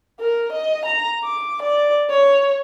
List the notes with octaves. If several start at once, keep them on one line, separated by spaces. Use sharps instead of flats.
A#4
D#5
A#5
D6
D5
C#5